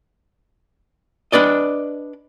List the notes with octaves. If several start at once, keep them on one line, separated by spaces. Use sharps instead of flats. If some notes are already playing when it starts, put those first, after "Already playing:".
D4 B4 D5 D#5